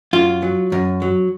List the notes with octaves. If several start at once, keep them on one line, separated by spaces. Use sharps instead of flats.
F#2 F4
F#3
F#2
F#3